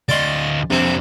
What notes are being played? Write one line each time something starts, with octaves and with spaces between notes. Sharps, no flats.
D2 D5 D#5 C6
F2 C3 C4 D4